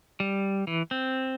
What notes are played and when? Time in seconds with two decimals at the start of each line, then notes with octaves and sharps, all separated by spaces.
0.20 G3
0.67 E3
0.91 C4